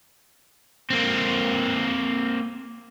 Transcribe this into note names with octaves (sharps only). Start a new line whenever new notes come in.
A#3 C4